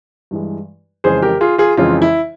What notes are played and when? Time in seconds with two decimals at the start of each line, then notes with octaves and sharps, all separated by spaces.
0.31 G2 E3 G#3
1.04 F2 C#3 E3 G#3 C#4 G#4 C5
1.22 G4 A#4
1.41 F4 G#4
1.58 F4 G#4
1.77 F2 C#3 E3 G#3 C#4 F4
2.02 E4